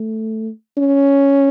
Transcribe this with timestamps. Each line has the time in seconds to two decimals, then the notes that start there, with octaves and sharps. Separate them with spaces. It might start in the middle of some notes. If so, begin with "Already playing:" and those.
Already playing: A3
0.78 C#4